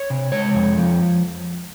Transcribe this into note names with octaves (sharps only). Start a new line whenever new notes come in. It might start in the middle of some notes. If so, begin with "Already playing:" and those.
Already playing: C#5
C3
G#3 C#5
F2
F3